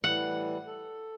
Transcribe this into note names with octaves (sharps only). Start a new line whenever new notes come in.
A2 E3 G3 F#5
A4